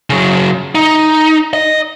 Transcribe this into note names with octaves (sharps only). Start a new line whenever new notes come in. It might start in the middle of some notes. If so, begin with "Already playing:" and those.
C#3 F#3
D#4
D#5